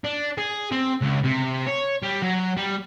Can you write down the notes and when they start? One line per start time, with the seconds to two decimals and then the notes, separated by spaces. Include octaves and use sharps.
0.04 D4
0.38 G#4
0.72 C4
1.02 C#2
1.24 C3
1.67 C#5
2.03 G3
2.22 F#3
2.57 G3